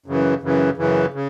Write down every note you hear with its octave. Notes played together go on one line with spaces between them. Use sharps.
F#2 C#3 E3
F#2 C#3 E3
F#2 C#3 E3
C#3